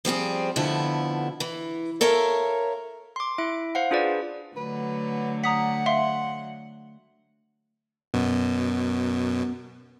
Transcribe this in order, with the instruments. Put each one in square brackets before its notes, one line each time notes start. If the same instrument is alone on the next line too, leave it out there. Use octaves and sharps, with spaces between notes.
[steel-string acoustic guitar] F3 G3 C4 G#4
F2 D3 F3 A3 B3 E4
E3
A4 A#4 C#5 E5 F5
[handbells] C6 D6
E4 E5 D7
C5 F5 F#5
D4 F4 G#4 B4 D5
[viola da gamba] D3 F#3 A3 [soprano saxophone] B4
[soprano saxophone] F#5 [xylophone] A#5 D#6 B6
[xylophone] E5 F5 C6
[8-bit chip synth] F#2 B2 [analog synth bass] B3